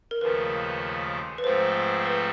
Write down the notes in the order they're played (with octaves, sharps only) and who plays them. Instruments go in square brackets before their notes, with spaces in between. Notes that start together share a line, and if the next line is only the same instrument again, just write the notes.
[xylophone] A#4
[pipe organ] D#2 C#3 F3 A3 [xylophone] B4
[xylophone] B4
[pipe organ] G#2 F3 A3 C4 [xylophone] C5
[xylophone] B4